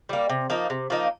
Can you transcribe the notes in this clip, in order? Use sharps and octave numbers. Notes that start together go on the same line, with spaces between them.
G3 A#3
C3
F3 A#3 D#4
C3
F3 A#3 D#4